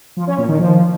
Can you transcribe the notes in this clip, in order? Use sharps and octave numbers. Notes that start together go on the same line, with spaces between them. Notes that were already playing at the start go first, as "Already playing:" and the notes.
F3
C#4
A#2
D#3
F3